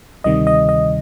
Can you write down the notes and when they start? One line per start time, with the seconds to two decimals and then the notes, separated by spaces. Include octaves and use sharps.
0.24 D2 C3 D#3 G3 D#5
0.47 D#5
0.69 D#5